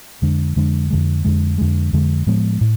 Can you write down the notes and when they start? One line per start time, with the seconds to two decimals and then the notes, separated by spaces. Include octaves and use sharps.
0.22 F2 D3 G#3 D4
0.56 F2 D3 G#3 D4
0.90 F2 D3 G#3
1.25 F2 D3 G#3
1.58 F2 D3 G#3
1.93 F2 D3 G#3
2.27 A2 F3 G#3 B3
2.61 A2